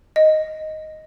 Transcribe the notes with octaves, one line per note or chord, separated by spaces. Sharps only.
D#5